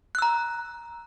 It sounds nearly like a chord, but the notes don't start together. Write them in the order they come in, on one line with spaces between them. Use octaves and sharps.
F#6 E6 A#5